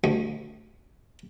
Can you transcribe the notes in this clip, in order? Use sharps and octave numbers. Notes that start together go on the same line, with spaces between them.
D2